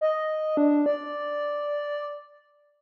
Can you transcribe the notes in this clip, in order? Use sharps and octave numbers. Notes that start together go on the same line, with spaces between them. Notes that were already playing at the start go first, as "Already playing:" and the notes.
D#5
D4
D5